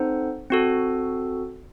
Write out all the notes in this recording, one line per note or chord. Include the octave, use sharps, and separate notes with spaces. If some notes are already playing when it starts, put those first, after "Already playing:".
Already playing: C4 D#4 A4 C5 F#5
C4 F#4 A4